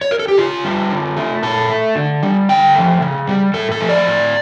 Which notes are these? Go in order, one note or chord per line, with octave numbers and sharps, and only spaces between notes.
C#5
A#4
A4
G4
C#3 F4
G3
D3
A3
A#2 A4
A3
D3
G3
D3 G5
F3 A3
C#3
G3
A2 A4
A4
F3 A3
D5
A2